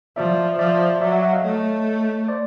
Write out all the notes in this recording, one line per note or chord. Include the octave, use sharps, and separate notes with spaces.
F3 D5 E5
F3 D5 E5
F#3 D5 E5
E5 F#5
E5 F#5
D#5 F5
A3 C#5 D#5
C5 D5